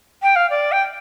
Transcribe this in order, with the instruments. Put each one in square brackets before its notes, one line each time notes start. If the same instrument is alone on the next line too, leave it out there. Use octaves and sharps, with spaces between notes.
[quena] G5
F5
D5
G5